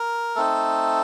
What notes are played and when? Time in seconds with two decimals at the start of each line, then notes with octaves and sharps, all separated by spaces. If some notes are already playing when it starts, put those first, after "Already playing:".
Already playing: A#4
0.35 A3 C4 D#4 A4